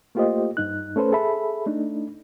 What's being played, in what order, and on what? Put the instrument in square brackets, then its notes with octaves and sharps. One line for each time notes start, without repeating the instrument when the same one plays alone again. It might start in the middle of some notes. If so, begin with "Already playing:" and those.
[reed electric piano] A3 A#3 F4 G4 C5 D#5
G2 D#4 F#6
A3 C#4 A4 B4 C5
G#4 A4 E5 B5
A3 D4 D#4